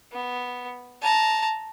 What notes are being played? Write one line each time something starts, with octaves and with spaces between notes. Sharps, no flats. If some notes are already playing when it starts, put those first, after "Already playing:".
B3
A5 A#5